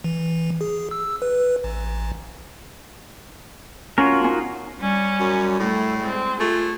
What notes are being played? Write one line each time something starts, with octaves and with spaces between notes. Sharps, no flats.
E3
G#4
E6
B4
A1
C#4 F4 F#4 A#4
C#4 D#4
G3 C#4
F#2
A2 A3
G#3 C4
A3 F4 G#4